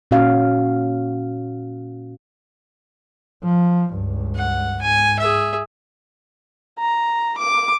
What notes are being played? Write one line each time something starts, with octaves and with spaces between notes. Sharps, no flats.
A#2 C#4 F#4 F5
F3
C#2 G2
F#5
G#2 G#5
G#4 E5
A#5
D6